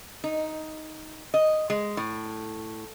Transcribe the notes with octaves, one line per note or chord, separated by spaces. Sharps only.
D#4
D#5
G#3
A2